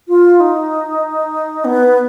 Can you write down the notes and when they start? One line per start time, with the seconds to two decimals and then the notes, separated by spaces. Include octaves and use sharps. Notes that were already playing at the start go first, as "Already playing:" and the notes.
0.08 F4
0.40 D#4
1.65 B3